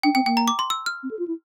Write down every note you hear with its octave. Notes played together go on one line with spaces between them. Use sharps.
D4 G5
C4 G5
A#3 G5
A#5
D6
C6
E6
F6
C4
A4
F4
E4